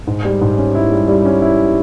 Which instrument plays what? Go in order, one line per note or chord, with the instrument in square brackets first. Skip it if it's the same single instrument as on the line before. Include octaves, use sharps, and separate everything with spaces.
[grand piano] G#2
G3
G#2
C#4
E4
G3
G3
C#4
E4